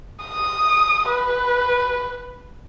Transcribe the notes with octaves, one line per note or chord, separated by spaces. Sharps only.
D#6
B4